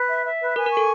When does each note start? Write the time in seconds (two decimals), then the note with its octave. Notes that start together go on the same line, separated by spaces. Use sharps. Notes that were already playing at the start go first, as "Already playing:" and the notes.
Already playing: B4
0.09 E5
0.24 E5
0.40 B4
0.56 A#4 G#5
0.66 A#4
0.72 C#6
0.77 A4